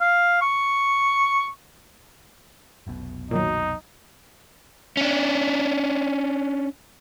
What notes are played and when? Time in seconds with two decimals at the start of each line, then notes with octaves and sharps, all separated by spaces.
0.01 F5
0.41 C#6
2.87 F1 B1 B2
3.31 A#2 D#3 F#3 D#4
4.97 C#4 D4